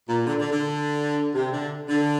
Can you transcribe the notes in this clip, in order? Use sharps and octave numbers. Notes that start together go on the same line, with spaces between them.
A#2
D3
D3
D3
C3
D3
D3